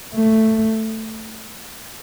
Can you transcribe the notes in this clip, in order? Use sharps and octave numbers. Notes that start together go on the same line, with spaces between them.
A3